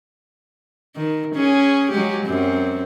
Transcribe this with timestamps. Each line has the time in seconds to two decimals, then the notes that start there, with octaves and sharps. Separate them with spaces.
0.96 D#3
1.35 C#4 G#4
1.91 F#3 G#3 G4
2.26 F#2 C4